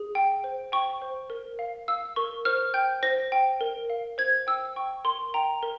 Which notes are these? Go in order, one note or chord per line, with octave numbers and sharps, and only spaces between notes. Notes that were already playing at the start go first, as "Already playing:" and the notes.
Already playing: G#4
G5
C5
G5 C#6
C5
A#4
F5
F5 E6
A#4 C#6
C5 F6
G5 G6
C5 A#6
G5
A#4
F5
C5 G#6
G5 E6
G5 C#6
A#4 C6
G5 A#5
A#4